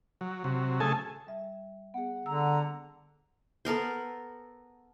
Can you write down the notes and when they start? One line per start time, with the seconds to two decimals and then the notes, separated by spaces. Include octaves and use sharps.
0.21 F#3
0.44 C3 F#3
0.80 C#3 A3 G#4 A4 G#5 A5
1.27 G3 E5
1.94 B3 G#4 F#5
2.26 D3 A#5 E6
3.65 B3 A4 A#4 C5